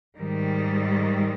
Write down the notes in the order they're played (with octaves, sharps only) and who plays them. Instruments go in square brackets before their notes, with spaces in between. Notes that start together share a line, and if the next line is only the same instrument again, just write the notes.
[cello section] G#2 D#3 G3